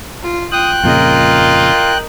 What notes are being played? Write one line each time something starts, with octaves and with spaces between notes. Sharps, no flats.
F4
F4 G5 D#6 F#6
F2 A#2 C#3 F4 A#4 D#5